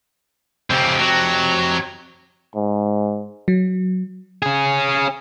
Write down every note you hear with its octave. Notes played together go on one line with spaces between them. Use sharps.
F2 C#3 C4 G4
F#3
G#2
F#3
C#4 G#4